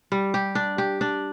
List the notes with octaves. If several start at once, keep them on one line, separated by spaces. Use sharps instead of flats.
G3
G4
D4
G4
D4